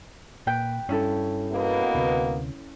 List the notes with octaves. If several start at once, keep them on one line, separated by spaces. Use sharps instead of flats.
A#2 B4 G5
G2 C#4 E4 A4
B2 A#3 B3
D2 C3